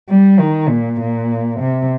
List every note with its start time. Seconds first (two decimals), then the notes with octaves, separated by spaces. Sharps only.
0.09 G3
0.39 D#3
0.69 A#2
1.00 A#2
1.59 C3